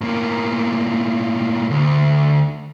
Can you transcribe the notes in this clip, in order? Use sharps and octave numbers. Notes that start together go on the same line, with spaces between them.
A2 A#3
D2